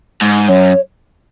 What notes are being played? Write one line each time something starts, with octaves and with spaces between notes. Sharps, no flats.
G#2
F#2 C#5